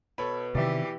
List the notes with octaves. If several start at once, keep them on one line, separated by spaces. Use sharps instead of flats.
B2 A4 C#5 B5
C3 D#3 E3 G4 D5 E5